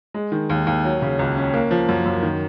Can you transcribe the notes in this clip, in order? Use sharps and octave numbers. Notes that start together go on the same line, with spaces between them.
G#3
D#3
D#2
D#2
F#3
C#3
C#2
C#4
A#3
F3
F#2
F#2
D#3